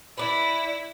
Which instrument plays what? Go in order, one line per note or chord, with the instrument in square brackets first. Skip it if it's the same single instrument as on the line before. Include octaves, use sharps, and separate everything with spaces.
[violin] E4 [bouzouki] B4 D5